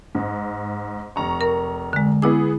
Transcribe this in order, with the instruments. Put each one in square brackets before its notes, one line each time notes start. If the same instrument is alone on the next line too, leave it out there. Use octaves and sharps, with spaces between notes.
[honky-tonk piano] G#2
F1 A#5 C#6
[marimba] A#4
D3 G#3
[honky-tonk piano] B3 G#4 [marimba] E4 D6